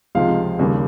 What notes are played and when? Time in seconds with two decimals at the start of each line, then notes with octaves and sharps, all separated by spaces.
0.15 C#2 C3 F3 G#3 F5
0.59 D#2 C#3 G3 A#3